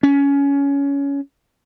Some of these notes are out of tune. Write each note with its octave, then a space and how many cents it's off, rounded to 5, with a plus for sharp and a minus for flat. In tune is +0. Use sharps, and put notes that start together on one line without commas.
C#4 +20